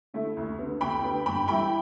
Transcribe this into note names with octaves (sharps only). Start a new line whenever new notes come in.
D3 A3 E4
D2
D3 B3
D2 G5 B5
D3 B3
G2 G5 B5
E3 G3 E4 G5 B5